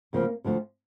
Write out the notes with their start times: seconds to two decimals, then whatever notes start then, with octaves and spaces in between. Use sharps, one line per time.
0.13 D2 C#3 F3 A#3
0.44 D2 D3 F3 A3